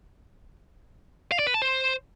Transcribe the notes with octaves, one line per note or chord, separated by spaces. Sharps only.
F5
D5
B4
A5
C5